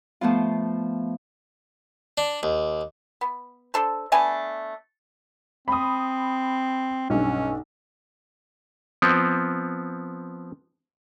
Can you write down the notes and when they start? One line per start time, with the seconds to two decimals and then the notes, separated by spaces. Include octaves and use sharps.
0.21 F3 A3 B3 F4
2.18 D4
2.43 D#2
3.21 B3
3.74 D4 A4 C5
4.12 A3 B3 D4 G#5
5.68 C4 B5 D#6
7.10 B1 G2 C#4
9.02 F3 B3 C4